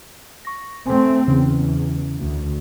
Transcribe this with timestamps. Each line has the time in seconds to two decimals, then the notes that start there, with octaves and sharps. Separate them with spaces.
0.45 C#6 A#6
0.86 A3 C4 G#5
1.28 E2 C#3 C#4
2.19 D2